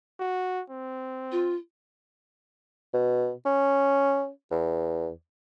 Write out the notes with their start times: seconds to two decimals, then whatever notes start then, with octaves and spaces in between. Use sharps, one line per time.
0.19 F#4
0.70 C4
1.32 F4
2.94 B2
3.46 C#4
4.51 E2